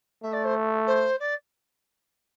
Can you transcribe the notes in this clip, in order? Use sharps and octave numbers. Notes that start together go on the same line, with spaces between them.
A3 E5
D5
C5
C5
D5